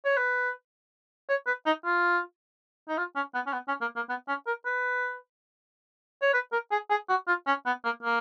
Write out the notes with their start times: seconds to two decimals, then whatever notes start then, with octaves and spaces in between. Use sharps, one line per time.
0.05 C#5
0.17 B4
1.29 C#5
1.47 B4
1.66 D#4
1.85 F4
2.89 D#4
2.98 F4
3.15 C#4
3.34 B3
3.46 C#4
3.53 B3
3.68 C#4
3.81 A#3
3.96 A#3
4.09 B3
4.28 C#4
4.47 A#4
4.65 B4
6.22 C#5
6.34 B4
6.52 A#4
6.71 G#4
6.90 G#4
7.09 F#4
7.27 F4
7.47 C#4
7.66 B3
7.84 A#3
8.02 A#3